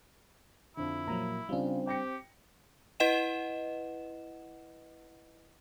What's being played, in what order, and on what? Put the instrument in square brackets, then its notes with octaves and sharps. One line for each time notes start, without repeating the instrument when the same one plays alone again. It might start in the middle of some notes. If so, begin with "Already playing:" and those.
[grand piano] F2 D3 [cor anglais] E4
[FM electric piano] A#2 F3 F#3 [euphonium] A#3 [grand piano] A#5
[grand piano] C#3 F4 [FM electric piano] G3 D4 [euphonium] C4
[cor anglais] G4 [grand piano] G5 A#6 C#7
[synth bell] E4 B4 D#5 F#5 E7